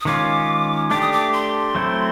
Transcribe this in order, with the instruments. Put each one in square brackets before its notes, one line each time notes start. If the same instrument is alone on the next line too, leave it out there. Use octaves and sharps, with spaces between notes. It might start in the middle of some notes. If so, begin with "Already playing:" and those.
[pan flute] D#6
[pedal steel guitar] D#3 G#3 C#4 F4 [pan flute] D6
[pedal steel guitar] A3 D4 G4 [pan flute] D6
[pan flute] D#6
D6
C6
[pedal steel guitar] F#3 A3 C4 E4